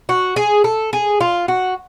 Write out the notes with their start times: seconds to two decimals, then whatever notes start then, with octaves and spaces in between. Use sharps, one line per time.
0.09 F#4
0.36 G#4
0.64 A4
0.93 G#4
1.21 F4
1.48 F#4